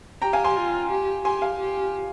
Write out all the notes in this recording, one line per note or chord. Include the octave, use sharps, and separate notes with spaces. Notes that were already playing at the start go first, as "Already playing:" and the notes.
G4 G5 A#5
F5 G#5
G#5 C6
F4
G4
G4 G#5 C6
F5 G#5
G4